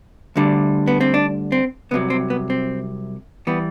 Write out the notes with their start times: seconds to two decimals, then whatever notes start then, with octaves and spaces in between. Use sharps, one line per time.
0.36 D2 D3 G3
0.87 B3
1.01 C4
1.14 D4
1.52 C4
1.91 C2 C3 F#3 B3
2.10 C4
2.30 B3
2.50 C4
3.47 E3 G3 B3